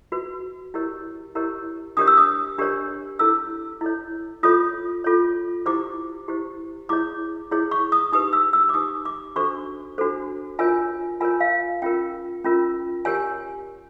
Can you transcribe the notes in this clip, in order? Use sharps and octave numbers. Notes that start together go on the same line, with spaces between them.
F#4 B4
E4 G4 A#4 C#5
E4 G4 A#4 C#5
D4 G4 A#4 C#5 D#6
E6
D#6
D4 G4 A#4 C#5
E4 A4 C#5 E6
E4 A4 C#5
F4 A4 C#5 D#6
F4 A4 C#5
E4 G4 C5 D6
E4 G4 C5
E4 G#4 C#5 D6
E4 G#4 C#5
C#6
D#6
D#4 G4 B4 D#6
E6
E6
D6
D#4 G4 B4 D#6
D6
D4 F#4 A4 C5 C#6
D4 F#4 A4 C5
F4 A#4 C#5 G#5
F4 A#4 C#5 G#5
F5
C#4 F4 A#4 G5
C#4 F4 A#4
G4 A#4 C#5 G#5